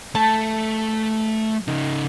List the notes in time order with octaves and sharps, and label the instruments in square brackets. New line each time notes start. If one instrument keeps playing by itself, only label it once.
[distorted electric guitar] A3 [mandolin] A5
[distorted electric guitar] C#3 D#4